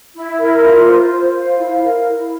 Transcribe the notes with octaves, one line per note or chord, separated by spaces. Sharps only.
E4
A#4
F4
C5
C5
F5
E4
A#4
E4